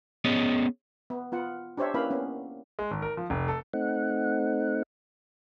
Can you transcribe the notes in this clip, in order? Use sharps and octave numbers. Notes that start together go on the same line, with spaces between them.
B3 C#4 G#4 C#5 D#5
B3
B3 F4 F#5
D4 G4 C5 C#5 E5
A#3 C#4 E4 B4 F5 B5
A#3 B3 C#4
G#3
G#1
A#4
F3
F1
A4
A3 C4 D#4 F#5